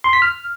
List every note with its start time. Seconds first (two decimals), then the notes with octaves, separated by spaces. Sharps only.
0.04 C6
0.13 B6
0.22 F6